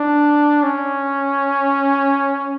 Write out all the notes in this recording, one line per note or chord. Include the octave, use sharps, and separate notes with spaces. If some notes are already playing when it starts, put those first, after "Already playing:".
Already playing: D4
C#4